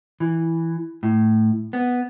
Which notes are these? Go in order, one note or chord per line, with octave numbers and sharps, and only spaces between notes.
E3
A2
B3